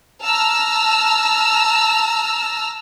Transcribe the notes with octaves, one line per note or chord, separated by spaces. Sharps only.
A5 A#5 E6 F6